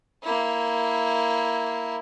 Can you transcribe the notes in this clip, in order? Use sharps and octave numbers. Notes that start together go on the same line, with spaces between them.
A#3 E4